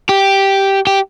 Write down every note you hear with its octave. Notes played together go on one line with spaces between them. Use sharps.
G4
G4